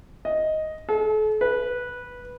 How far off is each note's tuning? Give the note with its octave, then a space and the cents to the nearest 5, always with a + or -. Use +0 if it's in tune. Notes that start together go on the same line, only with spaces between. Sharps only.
D#5 +5
A4 -40
B4 -10